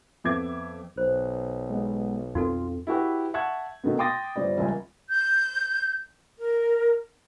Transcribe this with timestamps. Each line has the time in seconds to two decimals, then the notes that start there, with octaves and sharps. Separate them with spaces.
0.24 F2 B3 E5 D6 G#6
0.97 B1 C5
1.70 G#3 B3
2.35 F2 C4 D#4 F4 F#4 A4
2.87 E4 F#4 G4 B4
3.34 E5 F#5 A5 C#6 G#6
3.84 B2 D#3 F#3 A3 B3
3.99 G5 C6 D6 D#6 A6 A#6
4.36 G1 G3 C5 D5
4.58 D#1 C#2 G#5
5.09 G6
6.39 A#4